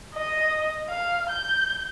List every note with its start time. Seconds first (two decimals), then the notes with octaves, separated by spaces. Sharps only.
0.14 D#5
0.89 F5
1.29 G6